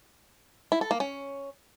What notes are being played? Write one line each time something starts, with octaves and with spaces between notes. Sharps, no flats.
E4
A4
A#3
C#4